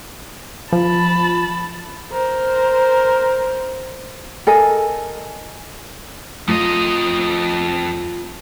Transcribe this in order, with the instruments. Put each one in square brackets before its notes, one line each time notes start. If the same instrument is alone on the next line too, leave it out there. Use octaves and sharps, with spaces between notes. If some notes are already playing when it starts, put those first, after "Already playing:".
[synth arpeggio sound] F3 [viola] A5 B5
[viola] A#4 C5
[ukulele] A4 A#4 D#5 G#5
[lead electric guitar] F2 D#5 [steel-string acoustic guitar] A3 F4 A#5